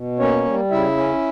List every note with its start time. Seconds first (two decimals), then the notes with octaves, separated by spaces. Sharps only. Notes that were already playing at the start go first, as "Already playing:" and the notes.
Already playing: B2
0.19 A#3 C#4 C#5
0.45 G3
0.71 C#3 E4 E5
0.97 C#4